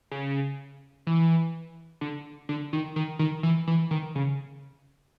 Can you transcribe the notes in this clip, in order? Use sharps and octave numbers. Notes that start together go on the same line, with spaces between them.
C#3
E3
D3
D3
D#3
D#3
D#3
E3
E3
D#3
C#3